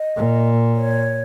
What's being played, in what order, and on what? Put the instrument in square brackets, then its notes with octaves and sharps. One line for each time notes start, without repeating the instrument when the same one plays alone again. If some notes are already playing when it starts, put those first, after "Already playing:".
Already playing: [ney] D#5
[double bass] A#2
[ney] C#5